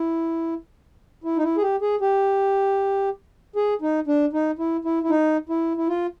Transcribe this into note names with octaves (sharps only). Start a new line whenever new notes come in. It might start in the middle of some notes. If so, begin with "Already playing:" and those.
Already playing: E4
E4
D#4
E4
G#4
G4
G#4
G4
G#4
D#4
D4
D#4
E4
E4
E4
D#4
E4
E4
F4